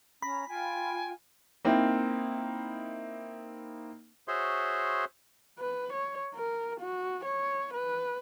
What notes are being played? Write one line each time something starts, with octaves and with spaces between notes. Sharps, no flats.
C#4 A#5 B5 A#6
F4 G5 G#5
A#3 C4 D#4 E4
F#4 G#4 C5 C#5 E5 C6
B4
C#5
A#4
F#4
C#5
B4